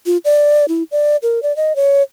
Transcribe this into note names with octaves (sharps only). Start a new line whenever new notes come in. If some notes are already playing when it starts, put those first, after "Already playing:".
F4
D5
E4
D5
A#4
D5
D#5
C#5